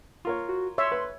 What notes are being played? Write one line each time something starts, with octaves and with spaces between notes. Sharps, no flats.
F4 A#4 C#5
F#4
C#5 E5 C6
B4